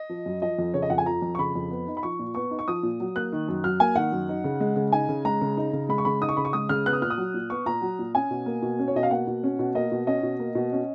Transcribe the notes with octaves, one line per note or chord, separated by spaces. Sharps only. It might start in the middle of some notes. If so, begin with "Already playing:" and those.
Already playing: D#5
F3
F#2
F3 D#5
F2
C#3 C#5
D#5
F2 F#5
G#5
F3 A#5
F2
C#6
C#3 B5
F2
B3
D#4
B5
F3 C#6
A#2
B3 C#6
D#4
C#6
F3 D#6
A#2
F#3
A#3 F#6
D#3
F#2
F#3 F6
A#3 G#5
D#3 F#5
F#2
D#4
C#3
G#3
C#3
D#4 G#5
C#3
G#3 A#5
C#3
D#4
C#3
G#3 B5
C#6
C#3 B5
D#4 D#6
C#6
C#3 B5
C#6
G#3 D#6
C#3 F6
B3 F#6
D#6
A#2 F6
D#6
F#3
A#2
B3 C#6
A#2 A#5
F#3
A#2
C#4 G#5
B2
A#3
B2
C#4
C#5
B2 D#5
F5
A#3 F#5
B2
C#4
B2
A#3 D#5
B2
C#4 D#5
B2
A#3
B2
C#4